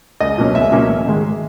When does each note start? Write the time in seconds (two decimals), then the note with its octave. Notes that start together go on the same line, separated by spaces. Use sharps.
0.20 C#2 D#5
0.38 B2 F#3 A#3 C#4
0.54 C#2 E5
0.72 B2 F#3 A#3 C#4
0.89 A1
1.06 G#2 D#3 G#3